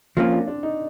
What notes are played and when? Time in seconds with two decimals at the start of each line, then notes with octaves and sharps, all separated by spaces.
0.17 F3 A#3 C4 C#4 F4
0.32 D4
0.48 D4
0.63 D#4